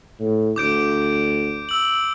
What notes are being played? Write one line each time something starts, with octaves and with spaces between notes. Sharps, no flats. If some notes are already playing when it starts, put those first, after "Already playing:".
A2
D2 D6 G6 D7
E6 F#7